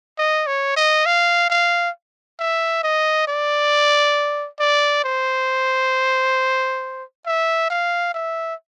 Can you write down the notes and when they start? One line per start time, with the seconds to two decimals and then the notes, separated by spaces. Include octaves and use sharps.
0.18 D#5
0.47 C#5
0.76 D#5
1.06 F5
1.50 F5
2.39 E5
2.83 D#5
3.28 D5
4.60 D5
5.04 C5
7.26 E5
7.70 F5
8.14 E5